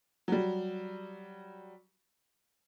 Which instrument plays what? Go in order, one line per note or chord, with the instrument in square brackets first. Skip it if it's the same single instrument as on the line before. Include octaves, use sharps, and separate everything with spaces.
[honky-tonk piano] F#3 G3